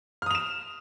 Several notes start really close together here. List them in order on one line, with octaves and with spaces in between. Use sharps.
F6 D#6 F7 E7